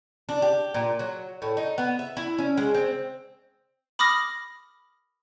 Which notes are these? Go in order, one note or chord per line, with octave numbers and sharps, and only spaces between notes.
D4
G4
A#2
F#3
A2
D#4
B3
E5
E4
C#4
G#3
C4
B5 D6 D#6 F6 A#6